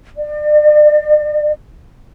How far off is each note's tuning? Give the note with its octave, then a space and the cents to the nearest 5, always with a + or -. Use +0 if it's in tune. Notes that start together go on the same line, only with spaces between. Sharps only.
D5 +40